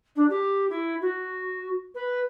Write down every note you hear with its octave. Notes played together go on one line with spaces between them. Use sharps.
D4
G4
E4
F#4
B4